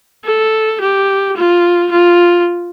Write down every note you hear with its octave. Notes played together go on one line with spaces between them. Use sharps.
A4
G4
F4
F4